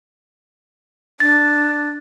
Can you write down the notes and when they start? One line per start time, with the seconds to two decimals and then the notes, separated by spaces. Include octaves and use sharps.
1.20 D4 A6